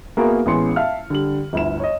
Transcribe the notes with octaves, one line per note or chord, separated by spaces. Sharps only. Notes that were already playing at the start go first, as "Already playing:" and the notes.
A#3 B3 E4 F#4 G#4 A#4
A1 G#3 B3 C#4 C6 C#7
E5 F5 A5 F6
D3 G3 F#7
G1 D2 E4 E7
C#5 D#5